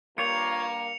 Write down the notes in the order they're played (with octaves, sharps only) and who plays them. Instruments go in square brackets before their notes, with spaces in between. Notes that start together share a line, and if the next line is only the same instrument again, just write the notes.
[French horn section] G2 A#3 [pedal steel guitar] F4 G4 C#5 [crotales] C#7 F7